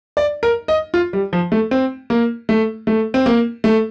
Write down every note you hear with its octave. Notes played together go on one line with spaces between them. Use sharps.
D5
A#4
D#5
F4
G3
F3
A3
C4
A#3
A3
A3
C4
A#3
A3